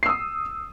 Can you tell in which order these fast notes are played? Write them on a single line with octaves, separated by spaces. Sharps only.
C7 E6 D#6